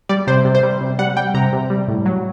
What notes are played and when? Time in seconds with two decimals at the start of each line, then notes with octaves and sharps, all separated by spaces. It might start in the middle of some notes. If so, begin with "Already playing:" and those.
0.09 G3 D5
0.27 C3 C5
0.45 C3
0.55 C5
0.63 G3
0.81 C3
0.99 G3 F#5
1.17 G3 G5
1.34 C3 A#5
1.53 C3
1.70 G3
1.88 A2
2.06 F#3